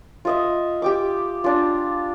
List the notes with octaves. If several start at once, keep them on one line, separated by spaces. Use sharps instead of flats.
F4 D#5 E5
G4 G5 D6
D4 F4